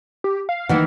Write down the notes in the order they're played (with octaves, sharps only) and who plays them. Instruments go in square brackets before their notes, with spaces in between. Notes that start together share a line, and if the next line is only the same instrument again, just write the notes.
[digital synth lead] G4
F5
[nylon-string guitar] D#3 E3 A#3 [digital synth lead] F#5